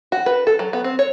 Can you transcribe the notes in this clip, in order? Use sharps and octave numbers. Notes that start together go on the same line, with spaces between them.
F#4
B4
A4
F#3
B3
C4
C#5